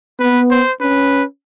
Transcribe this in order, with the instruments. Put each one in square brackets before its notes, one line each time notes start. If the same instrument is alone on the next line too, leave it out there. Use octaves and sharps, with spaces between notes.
[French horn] B3 [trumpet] B4
[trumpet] C5
[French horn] C#4 [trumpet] B4